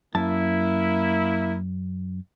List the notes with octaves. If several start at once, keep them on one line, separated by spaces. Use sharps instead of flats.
F#2 A#3 E4 A5